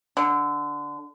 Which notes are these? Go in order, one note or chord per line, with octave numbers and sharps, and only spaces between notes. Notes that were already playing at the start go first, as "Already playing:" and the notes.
D3